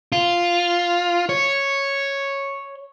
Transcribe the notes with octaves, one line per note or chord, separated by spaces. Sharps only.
F4
C#5